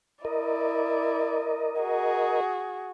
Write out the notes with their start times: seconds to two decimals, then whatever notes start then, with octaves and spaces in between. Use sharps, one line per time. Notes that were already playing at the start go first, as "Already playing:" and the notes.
0.25 E4 A#4 D5 D#5
1.81 F#4 G#4